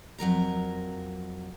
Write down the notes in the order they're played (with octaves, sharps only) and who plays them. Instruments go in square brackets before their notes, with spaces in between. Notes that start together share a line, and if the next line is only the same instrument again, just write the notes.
[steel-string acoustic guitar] F2 F#3 A#4 A#5